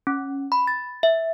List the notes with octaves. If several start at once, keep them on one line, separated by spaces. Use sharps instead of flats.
C#4
B5
A6
E5